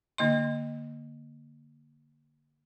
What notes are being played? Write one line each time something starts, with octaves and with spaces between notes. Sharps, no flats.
D3 A#3 D#5 C6